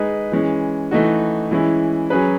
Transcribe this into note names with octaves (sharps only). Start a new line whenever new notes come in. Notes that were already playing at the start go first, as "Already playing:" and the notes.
Already playing: G#3 D#4 G#4 B4
E3 G#3 C#4
E3 A3 D#4 F#4
E3 G#3 C#4 E4
F#3 C#4 G#4 B4